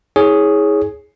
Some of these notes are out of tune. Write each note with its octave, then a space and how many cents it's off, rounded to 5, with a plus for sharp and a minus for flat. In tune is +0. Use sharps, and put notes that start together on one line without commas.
E4 -40 G#4 +0 C#5 +0